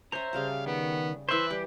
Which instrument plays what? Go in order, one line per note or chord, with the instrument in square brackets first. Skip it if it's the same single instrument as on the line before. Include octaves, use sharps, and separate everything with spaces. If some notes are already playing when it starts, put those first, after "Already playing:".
[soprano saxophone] C#4 [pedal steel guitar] C5 A#5 [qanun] C#5 E5
[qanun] C#3 G3 A5 [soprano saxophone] F5
[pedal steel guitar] D#3 [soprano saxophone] B3
[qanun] E3 D5 [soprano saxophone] B4 [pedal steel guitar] C5 E5
[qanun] G3 [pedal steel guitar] G4